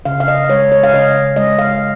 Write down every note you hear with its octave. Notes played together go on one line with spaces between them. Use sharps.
C#3 F5
F5
D#5
G#3 C#5
C#5
F5
C#3 D#5
G#3 D#5
F5